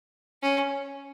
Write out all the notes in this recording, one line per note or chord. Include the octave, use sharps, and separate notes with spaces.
C#4